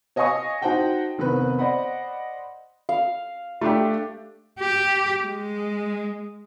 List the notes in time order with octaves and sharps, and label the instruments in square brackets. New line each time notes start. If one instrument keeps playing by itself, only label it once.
[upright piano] C#5 D#5 F5 G#5 C#6 D#6
D#4 F#4 C5 F#5 G5 A5
F1 D#3 B3 C4 B4
C5 D5 D#5 F#5 B5
[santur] F5
[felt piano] A3 D4 G4
[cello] G4
G#3